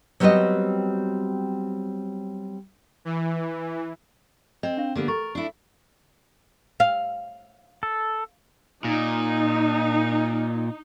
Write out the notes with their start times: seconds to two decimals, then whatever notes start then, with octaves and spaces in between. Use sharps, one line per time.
0.20 F#3 G3 B3 C4 F#4 D#5
3.05 E3
4.63 C4 D#5
4.77 D4 F5
4.96 D3 A#3 B3 G4
5.08 A#4 C#6 A6
5.35 D4 E4
6.80 F5
7.83 A4
8.84 A#2 D#4